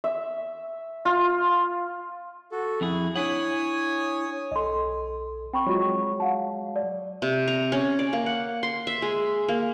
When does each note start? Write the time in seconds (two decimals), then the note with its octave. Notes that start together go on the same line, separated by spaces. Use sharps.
0.04 E5
1.05 F4
2.52 F#4 A4
2.81 F2 E4 G#4
3.16 D4 E4 C#5 F#5 G#5 D#6
4.52 B1 A4 D#5 C6
5.54 C4 G5 B5 C#6
5.66 F#3 G#3 F4 F#4 C#6
6.20 F5 F#5 A5
6.76 D5
7.22 C3
7.48 A#5
7.72 C#4
7.99 D5
8.13 A#3
8.26 F#5
8.63 C6
8.87 E5
9.02 G#3
9.49 A#3